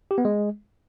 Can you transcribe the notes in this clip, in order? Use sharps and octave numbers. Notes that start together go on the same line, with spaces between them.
G4
B3
G#3